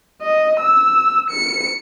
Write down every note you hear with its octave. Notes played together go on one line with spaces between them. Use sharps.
D#5
E6
C#7